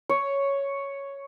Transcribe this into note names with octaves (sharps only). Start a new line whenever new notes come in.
C#5